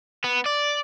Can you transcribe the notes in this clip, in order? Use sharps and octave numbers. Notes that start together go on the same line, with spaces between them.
B3
D5